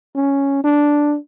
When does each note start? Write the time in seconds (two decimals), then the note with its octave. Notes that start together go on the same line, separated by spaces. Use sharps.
0.15 C#4
0.64 D4